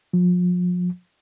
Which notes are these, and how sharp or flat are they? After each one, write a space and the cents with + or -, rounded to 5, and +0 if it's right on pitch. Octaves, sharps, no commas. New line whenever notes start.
F3 +35